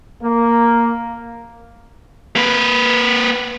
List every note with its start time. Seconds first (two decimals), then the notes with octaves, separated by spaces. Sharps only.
0.23 A#3
2.36 A#3 B4